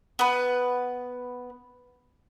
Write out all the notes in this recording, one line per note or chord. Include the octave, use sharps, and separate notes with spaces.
B3 B4